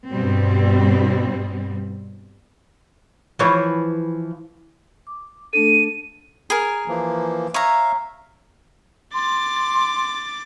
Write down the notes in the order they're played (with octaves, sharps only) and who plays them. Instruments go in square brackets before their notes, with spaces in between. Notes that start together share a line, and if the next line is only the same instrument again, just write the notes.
[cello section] G2 B2 G3 C4
[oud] E3 F3 C#5
[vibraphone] D6
[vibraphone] A3 D4 A4 [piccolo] D#7
[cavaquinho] G#4 A#4 [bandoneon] G#5
[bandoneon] E3 F3 A#3
[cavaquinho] C#5 A#5 [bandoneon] E5 F5
[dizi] C6 [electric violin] D6 A6